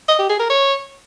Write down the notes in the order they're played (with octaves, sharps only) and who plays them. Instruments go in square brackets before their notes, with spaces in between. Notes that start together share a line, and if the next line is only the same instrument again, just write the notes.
[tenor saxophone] D#5
G4
G#4
A#4
C#5